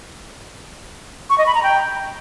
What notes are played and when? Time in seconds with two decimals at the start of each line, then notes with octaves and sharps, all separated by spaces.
1.30 C#6
1.38 D#5
1.46 B5
1.55 A#5
1.63 G5